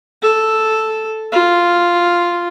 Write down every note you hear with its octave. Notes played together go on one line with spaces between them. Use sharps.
A4
F4